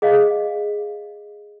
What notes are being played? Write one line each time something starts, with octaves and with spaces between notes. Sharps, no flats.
G#4 D#5 F5